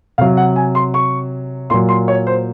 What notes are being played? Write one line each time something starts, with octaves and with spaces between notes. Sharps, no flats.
C3 F#3 F5
F#5
G#5
C6
C#6
A#2 F#3 C6
C6
C#5
C5